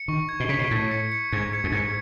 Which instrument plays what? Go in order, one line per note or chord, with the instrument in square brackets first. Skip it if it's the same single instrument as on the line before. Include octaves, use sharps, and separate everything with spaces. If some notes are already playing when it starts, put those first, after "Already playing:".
Already playing: [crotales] C#7
[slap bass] D#3 [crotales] C#6
[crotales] G#6
[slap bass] B2
[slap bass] C#3 [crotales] B6
[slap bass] B2
[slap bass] A2 [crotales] G#6
[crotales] C#7
C#7
[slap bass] G#2 [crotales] G#6
[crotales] C#7
[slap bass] F#2
G#2
[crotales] C#7